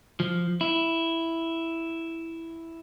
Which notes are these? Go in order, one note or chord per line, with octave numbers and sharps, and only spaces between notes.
F3
E4